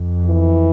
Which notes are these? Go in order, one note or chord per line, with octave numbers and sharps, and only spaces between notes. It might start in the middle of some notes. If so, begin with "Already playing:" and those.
Already playing: F2
E3